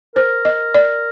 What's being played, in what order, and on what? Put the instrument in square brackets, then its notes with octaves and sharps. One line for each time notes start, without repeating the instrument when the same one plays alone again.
[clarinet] A#4 [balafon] C5
[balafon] D#5
D5